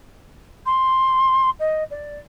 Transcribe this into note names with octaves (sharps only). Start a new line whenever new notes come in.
C6
D#5
D5